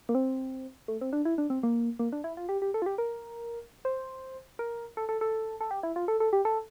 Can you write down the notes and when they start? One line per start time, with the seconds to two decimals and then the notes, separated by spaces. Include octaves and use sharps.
0.09 A#3
0.15 C4
0.88 A3
1.01 C4
1.13 D4
1.25 E4
1.38 D4
1.50 C4
1.63 A#3
1.99 A#3
2.12 D4
2.24 E4
2.37 F4
2.49 G4
2.62 G4
2.74 A4
2.82 F4
2.86 G4
2.98 A#4
3.85 C5
4.59 A#4
4.97 A4
5.09 A4
5.21 A4
5.61 A4
5.71 G4
5.83 E4
5.96 F4
6.08 A4
6.20 A4
6.33 G4
6.45 A4